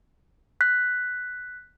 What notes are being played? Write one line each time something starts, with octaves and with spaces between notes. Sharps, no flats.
F#6 B6